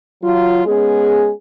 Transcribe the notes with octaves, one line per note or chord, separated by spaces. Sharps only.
F#3 F4
G#3 B3 C#4 G#4